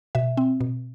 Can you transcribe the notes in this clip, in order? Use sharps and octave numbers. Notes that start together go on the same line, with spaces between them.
B2 E5
C4
B2